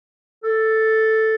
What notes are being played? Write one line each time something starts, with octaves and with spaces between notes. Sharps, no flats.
A4